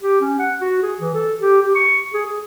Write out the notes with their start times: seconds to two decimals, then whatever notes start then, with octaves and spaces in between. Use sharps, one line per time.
0.01 G4
0.21 C#4
0.39 F#5
0.61 F#4
0.82 G#4
1.00 E3
1.14 A4
1.41 G4
1.61 G4
1.75 C#6
2.14 G#4
2.26 G#4